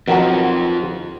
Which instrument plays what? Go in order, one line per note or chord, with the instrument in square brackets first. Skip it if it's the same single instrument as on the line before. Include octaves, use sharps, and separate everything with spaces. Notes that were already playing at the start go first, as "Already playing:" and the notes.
[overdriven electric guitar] F2 F3 [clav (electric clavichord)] B2 D#3 F#3